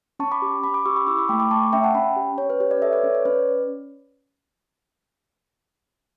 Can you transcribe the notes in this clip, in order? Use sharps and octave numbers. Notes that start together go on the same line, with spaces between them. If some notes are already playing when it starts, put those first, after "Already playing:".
C#4 A5 C#6
B5 D6
G4
C#4 B5 D6
B5 D6
G4 C#6 E6
B5 D6
E4 C#6 E6
B5 D6
A3 G5 B5
B5 D6
A3 A5 C#6
C#4 E5 G5
F#5 A5
C#4 G5 B5
G4
C#4 C#5
B4
G4 C#5
B4 D5
A4 C#5 E5
B4 D5
C#4 C#5
C#5
C#4 B4 D5